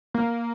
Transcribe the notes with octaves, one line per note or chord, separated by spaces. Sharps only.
A#3